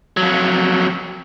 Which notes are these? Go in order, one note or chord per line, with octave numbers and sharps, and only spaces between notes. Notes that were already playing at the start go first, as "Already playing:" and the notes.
F2 F#3